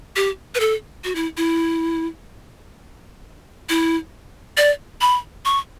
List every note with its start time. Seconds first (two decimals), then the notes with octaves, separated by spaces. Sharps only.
0.16 G4
0.55 B4
0.60 A4
1.04 F#4
1.15 E4
1.37 E4
3.69 E4
4.57 D5
5.01 B5
5.45 C#6